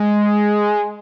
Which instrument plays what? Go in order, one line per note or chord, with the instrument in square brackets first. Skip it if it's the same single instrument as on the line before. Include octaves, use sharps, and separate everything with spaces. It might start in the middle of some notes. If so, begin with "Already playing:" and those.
Already playing: [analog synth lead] G#3